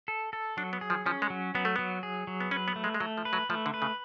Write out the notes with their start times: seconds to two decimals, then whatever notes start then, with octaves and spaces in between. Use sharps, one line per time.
0.08 A4
0.33 A4
0.57 F#3 D4
0.73 B3
0.81 G#4
0.90 F3
1.06 F3 C#4
1.22 G#3
1.30 F#3
1.55 F#3 B3
1.65 A3
1.76 F#3 B3
2.03 G#4
2.27 F#3
2.40 B3
2.51 C#4 B4
2.68 B3
2.76 A3
2.84 G#3
2.94 G#3
3.00 F#3 A3
3.17 F3
3.25 B4
3.33 F#3
3.49 F3 A3
3.66 D3
3.74 B4
3.82 C#3